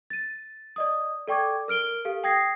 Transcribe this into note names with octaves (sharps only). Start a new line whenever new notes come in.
A6 D#7
D5 D#5 D#6
A4 D5 G5 C#6 D6 G#6
A#4 F6 D7 G7
G4 A4 F5
G5 D#6 G#6 A#6 C7